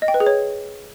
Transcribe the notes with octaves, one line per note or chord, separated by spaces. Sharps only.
D#5
G5
B4
G#4
C#5